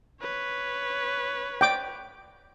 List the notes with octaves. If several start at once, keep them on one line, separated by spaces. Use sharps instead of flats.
B4 C#5
G5 D6